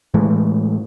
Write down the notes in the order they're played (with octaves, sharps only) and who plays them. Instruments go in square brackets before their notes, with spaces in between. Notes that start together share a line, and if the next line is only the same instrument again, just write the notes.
[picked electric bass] A2 E3 G#3